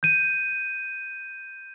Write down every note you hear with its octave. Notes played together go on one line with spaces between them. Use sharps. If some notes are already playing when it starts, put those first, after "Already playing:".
G6 D#7